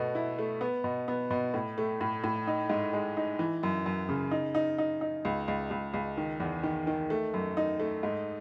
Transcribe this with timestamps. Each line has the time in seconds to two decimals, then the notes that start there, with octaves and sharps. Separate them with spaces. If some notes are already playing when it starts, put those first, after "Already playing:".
Already playing: B2 A3 B3
0.15 E4
0.38 A3
0.61 B3
0.84 B2
1.08 B3
1.31 B2
1.54 A2
1.78 A3
2.01 A2
2.24 A2
2.47 D#4
2.70 G#2
2.93 G#3
3.17 D#4
3.39 E3
3.63 F#2
3.86 F#2
4.09 C#3
4.31 D#4
4.55 D#4
4.78 D#4
5.01 D#4
5.25 C#2
5.48 C#2
5.71 C#2
5.94 C#2
6.17 D#3
6.40 E2
6.63 D#3
6.87 D#3
7.10 A3
7.34 F#2
7.57 D#4
7.80 A3
8.03 G#2